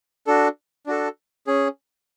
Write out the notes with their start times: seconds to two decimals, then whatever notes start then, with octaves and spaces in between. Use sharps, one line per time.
0.27 D4 F#4 A4
0.87 D4 F#4 A4
1.47 C#4 G#4